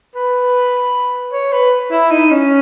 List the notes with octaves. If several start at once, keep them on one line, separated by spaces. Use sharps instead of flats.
B4
C#5
B4
E4
D#4
C#4